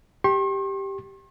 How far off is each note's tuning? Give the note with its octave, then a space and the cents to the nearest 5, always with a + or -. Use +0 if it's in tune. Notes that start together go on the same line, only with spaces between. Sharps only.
G4 +0 C6 +45